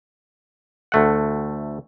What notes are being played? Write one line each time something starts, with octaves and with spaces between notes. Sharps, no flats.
D2 A3 F#5